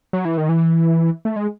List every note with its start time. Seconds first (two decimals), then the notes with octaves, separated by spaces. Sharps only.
0.13 F#3
0.25 E3
0.37 D#3
0.49 E3
1.25 A3
1.36 G#3